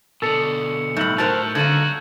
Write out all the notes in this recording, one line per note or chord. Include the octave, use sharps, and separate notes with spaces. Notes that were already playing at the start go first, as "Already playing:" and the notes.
B2 D3 A4 E6 C#7
B1 A2 G3 D#4 G6 F#7
A2 F#4 A#4 C5 A5 F#6 F7
C#2 D3 A#3 F#4 G#6 D#7